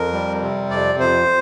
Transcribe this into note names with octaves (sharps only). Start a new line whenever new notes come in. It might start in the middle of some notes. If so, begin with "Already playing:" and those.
Already playing: F2 A#4
G3
C3
F2 D5
F2 C5